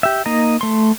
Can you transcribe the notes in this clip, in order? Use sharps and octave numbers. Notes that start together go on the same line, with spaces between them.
G4 E5
A#3 D#4 D#5 A#5
A3 C6